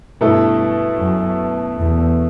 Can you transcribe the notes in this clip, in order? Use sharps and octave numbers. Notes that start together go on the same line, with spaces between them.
G2 B2 A3 E4 A4
F#2
E2